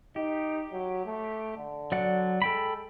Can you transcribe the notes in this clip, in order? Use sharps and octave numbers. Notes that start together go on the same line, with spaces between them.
D#4 G4
F#3
A3
D3
F#3 D5 F#5
G#3 A4 G5 B5